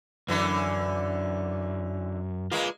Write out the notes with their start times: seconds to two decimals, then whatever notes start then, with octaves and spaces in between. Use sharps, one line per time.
0.28 F#2 D3 E3
2.52 G#3 A#3 F4 B4